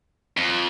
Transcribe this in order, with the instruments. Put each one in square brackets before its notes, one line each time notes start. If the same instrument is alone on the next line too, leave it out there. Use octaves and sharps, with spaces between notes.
[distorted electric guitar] F2